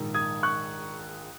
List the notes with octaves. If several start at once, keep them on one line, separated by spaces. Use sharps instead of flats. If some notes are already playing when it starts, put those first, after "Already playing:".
Already playing: A#1 G#2 D#3 G#3
D#6 G#6
C#6 F#6